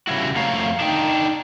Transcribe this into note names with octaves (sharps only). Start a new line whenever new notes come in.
C#3 G3 E4 F#4
F2 F3 A3 C#5 F5 A#5
D4 D#4 G5